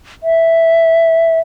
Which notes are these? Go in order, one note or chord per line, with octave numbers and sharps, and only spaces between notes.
E5